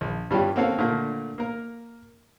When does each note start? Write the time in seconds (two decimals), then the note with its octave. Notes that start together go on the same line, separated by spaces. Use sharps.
0.01 A#1
0.31 G2 G3 C#4 F4 G4
0.56 A#3 C4 C#4 F#4 A4 F5
0.78 A#2 D3 A3 A#3
1.38 A#3 A#4